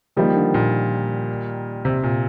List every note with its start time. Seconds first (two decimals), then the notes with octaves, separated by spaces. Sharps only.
0.16 D#3 F3 G3 A#3 D#4
0.35 D3
0.54 A#2
1.85 C3
2.03 A#2